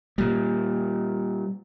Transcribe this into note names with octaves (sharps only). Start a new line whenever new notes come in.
A#2 G3